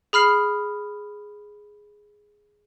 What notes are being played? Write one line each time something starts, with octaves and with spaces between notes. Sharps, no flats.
G#4 B5 F6 C7